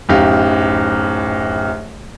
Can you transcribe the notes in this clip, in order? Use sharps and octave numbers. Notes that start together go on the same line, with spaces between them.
D1 F#2 D#4 G4 F5